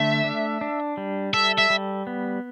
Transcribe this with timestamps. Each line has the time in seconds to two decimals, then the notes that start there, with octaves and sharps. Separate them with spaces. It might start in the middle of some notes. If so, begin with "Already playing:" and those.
Already playing: D3 A3 E5
0.24 D4
0.61 D4
0.97 G3
1.34 A4 E5
1.58 E5
1.70 G3
2.07 B3